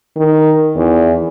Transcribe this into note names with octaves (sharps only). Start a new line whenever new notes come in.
D#3
E2